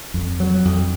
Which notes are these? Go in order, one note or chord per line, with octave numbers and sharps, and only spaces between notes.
F2
F#3
F2